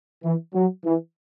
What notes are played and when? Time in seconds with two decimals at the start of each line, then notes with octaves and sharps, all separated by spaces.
0.24 E3
0.55 F#3
0.85 E3